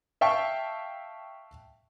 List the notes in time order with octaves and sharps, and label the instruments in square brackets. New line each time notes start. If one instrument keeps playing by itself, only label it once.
[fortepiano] E5 F5 G5 A5 C#6